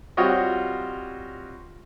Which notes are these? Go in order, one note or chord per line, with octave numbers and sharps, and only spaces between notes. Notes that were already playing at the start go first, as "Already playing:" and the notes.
G3 C4 F4 F#4 C#5 D#5